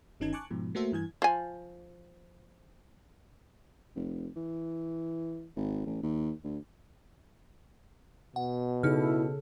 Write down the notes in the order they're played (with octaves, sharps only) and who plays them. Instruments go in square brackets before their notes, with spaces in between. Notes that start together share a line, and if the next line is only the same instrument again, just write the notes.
[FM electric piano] G1 D#3 C#4 D#4 A5 G#6
G#5 A5 C#6 D6 F#6
G#2 B2 F3
A3 A#3 F#4 A4 C5 E5
G2 E3 G#5 G#6
[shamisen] F3 G#5
[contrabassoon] F1
E3
G#1
A1
D#2
D2
[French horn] B2 [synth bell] F#5
[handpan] C#3 A4 [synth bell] D#4 F6 [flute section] E4